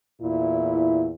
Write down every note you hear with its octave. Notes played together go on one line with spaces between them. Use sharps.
E2 A#2 E4